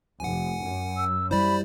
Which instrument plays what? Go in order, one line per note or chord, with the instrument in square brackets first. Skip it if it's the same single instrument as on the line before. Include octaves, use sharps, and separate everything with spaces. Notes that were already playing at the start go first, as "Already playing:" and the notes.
[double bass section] F1 [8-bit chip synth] F#5 G#5
[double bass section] F#2
[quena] E6
[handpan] G3 E4 [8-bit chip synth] C5 D5 [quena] B5